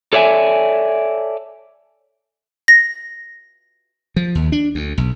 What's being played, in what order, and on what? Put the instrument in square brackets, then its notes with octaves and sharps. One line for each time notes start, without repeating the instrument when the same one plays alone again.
[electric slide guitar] A4 C#5 D5 E5 G#5
[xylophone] A#6
[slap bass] F3
D#2
D4
D2
B1